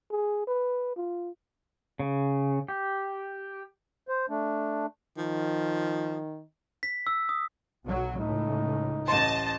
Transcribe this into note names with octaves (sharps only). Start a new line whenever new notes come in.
G#4
B4
F4
C#3
G4
C5
A3 D4
D#3 F3
B6
E6
D#6
B1 F#3
C#2 A2 D#4
A1 D#5 A5 C6